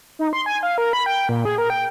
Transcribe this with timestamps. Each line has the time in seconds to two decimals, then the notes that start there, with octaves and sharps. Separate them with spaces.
0.19 D#4
0.33 C6
0.46 G#5
0.63 F5
0.78 A#4
0.93 B5
1.06 G5
1.29 A#2
1.45 G#4
1.58 A#4
1.70 G5